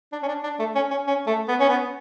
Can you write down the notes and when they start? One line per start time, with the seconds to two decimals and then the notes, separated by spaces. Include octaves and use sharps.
0.12 D4
0.23 C#4
0.28 D4
0.43 D4
0.59 A3
0.75 C#4
0.91 C#4
1.07 C#4
1.27 A3
1.48 B3
1.60 C#4
1.69 B3